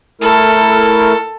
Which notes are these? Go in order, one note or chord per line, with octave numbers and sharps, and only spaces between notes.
A3 E4 A4 A#4